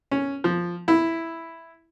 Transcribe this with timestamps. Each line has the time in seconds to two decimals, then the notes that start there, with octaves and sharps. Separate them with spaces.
0.11 C#4
0.44 F3
0.88 E4